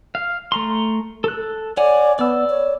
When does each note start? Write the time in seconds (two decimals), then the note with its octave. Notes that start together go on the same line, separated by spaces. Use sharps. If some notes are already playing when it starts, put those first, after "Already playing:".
0.15 F5
0.52 A3 A#5 C6
1.24 A4 F#6
1.77 C#5 D5 F#5 G#5
2.19 B3 D5 E6
2.50 C#5